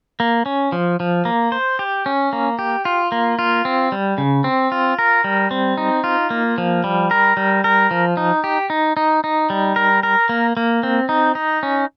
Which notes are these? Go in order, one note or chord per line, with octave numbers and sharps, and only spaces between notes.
A#3
C#4
F3
F3
A#3
C5
G4
C#4
A#3
G4
F4
A#3
F4
C4
G3
C#3
C4
F4
A#4
G3
C4
D#4
F4
A#3
F3
G3
A#4
G3
A#4
F3
D#4
G4
D#4
D#4
D#4
G3
A#4
A#4
A#3
A#3
C4
D#4
D#4
C#4